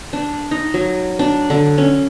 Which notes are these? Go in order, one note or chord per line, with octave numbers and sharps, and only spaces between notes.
D4
D#4
F#3
D4
D3
C#4